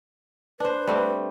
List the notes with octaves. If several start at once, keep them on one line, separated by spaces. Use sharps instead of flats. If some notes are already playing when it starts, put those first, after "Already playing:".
D4 B4 C5
G3 A3 C4